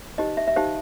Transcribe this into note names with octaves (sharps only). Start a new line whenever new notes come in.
D#4 G4 C5 D#5
E5
E5
D#4 G4 C5 F5